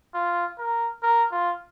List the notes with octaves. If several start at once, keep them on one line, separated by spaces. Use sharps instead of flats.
F4
A#4
A#4
F4